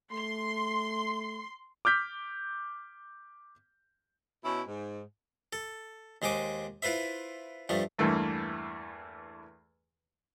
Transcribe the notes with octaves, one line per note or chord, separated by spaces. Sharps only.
A3 C6
D6 F6 G6 B6
B2 C#4 E4
G#2
A4
D#2 G#3 C5 G#5 D6
E4 F4 B4 C5 E5
G2 F3 A3
E2 G2 E3 A3 A#3